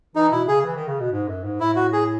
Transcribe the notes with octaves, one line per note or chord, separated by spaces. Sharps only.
E3 D#4
B2 E4
C#3 G#4
E3
D#3
C#3
B2
G#2
F#2
G#2
A2 E4
F#4
G#4